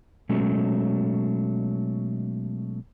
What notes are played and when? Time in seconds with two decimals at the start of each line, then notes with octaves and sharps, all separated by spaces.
0.29 B2 F#3 G#3 A3 C#4